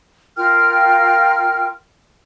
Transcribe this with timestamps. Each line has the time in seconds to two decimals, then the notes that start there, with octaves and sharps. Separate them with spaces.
0.37 F4 A#4 G5 F6